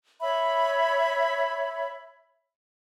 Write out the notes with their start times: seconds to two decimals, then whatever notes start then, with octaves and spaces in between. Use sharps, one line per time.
0.21 C#5 E5 B5